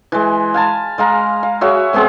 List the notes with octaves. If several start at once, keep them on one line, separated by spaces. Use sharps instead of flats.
E3 G#3
F5 G#5 A5 B5
G#3 F5 A#5
F5
F#4 G#4 C#5 E5
G#3 B3 C4 G#4